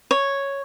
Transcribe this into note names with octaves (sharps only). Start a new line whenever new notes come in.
C#5